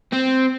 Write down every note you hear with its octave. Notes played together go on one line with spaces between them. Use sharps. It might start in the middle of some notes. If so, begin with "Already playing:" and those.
C4